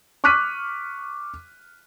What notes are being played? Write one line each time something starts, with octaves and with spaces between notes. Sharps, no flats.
C#6 D6 F6 F#6 B6 D#7